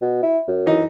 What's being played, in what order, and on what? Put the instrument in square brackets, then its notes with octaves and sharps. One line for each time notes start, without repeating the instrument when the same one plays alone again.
[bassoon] B2
E4
F#2
[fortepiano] E3 D#4